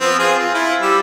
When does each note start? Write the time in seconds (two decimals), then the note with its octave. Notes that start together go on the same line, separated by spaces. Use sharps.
0.01 F3 B3 C4
0.19 C4 F4 G#4
0.38 F4
0.54 E4 F4
0.82 G3 E6